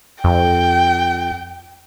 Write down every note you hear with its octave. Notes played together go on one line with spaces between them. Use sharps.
F2 G5